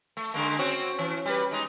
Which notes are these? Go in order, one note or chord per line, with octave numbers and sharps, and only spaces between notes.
A3
D3 G#3 A#3
C4 C#4 F#4
E3 C#4
G3 B4
G#3 D#4